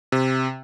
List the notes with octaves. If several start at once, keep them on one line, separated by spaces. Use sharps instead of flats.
C3